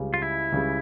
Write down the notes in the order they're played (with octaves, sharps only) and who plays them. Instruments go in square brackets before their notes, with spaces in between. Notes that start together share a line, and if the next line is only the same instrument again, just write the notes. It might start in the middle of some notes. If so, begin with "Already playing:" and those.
Already playing: [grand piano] C#2 C#3 G3
[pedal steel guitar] F4
E4
[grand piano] C#2 C#3 G3